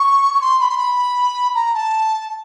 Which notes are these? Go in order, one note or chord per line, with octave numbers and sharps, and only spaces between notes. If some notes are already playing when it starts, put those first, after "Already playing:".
Already playing: C#6
C#6
C6
B5
C6
B5
A#5
A5